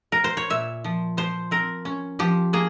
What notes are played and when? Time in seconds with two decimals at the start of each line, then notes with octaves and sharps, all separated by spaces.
0.12 A#4
0.24 C5
0.37 C#5
0.50 A#2 E5
0.84 F3
1.17 F3 C5
1.51 C4 A#4
1.85 C#4
2.19 F3 G4
2.53 A#3 G#4